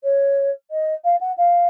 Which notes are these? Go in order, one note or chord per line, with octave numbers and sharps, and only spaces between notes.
C#5
D#5
F5
F#5
F5